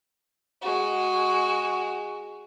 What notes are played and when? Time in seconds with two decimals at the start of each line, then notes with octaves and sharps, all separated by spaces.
0.62 G#3 F#4